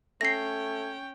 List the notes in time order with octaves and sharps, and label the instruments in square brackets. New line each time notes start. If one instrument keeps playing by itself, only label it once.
[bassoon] A3 [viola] C#4 G5 [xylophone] A#6 C7